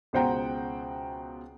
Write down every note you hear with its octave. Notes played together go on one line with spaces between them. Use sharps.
C#2 B2 C5 F#5 G5 A#5